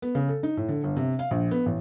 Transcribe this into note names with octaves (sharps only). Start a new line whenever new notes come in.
B3
C#3
A4
D#4
A2
D3
G1
C3
F5
A#1
B3
A1